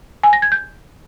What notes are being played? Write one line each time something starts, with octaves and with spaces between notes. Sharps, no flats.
G#5
A#6
G#6
G6